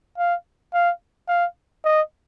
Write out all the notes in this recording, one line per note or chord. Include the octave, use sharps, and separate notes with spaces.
F5
F5
F5
D#5